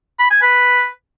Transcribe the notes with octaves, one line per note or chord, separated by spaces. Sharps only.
B5
G#5
B4